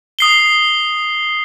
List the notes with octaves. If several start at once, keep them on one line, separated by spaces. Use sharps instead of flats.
D#6 C7 G7